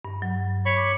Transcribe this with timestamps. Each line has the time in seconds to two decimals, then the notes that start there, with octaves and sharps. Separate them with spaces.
0.05 G2
0.22 F#3
0.66 C#5 B5 C#6
0.77 D6